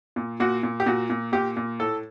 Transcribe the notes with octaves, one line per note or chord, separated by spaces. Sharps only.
A#2
A#2 F#4
A#2
G4
A#2 F#4
A#2
A#2 G4
A#2
A2 A4